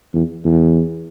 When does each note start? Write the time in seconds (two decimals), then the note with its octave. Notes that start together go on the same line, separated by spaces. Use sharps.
0.13 E2
0.45 E2